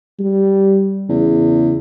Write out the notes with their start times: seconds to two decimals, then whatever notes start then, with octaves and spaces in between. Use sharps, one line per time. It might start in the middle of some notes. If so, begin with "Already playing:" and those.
0.19 G3
1.09 E2 C#3